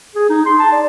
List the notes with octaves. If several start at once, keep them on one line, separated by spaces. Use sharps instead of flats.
G#4
D#4
C6
A5
D5